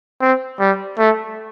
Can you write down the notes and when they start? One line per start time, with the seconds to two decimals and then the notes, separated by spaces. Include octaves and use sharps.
0.21 C4
0.60 G3
0.98 A3